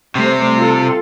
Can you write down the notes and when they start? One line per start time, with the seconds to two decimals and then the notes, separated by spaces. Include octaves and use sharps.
0.15 C3 G3 A3 C5
0.57 F4 A4